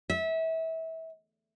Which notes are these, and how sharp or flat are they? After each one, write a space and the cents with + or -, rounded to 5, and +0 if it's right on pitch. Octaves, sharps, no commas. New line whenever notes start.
E5 -25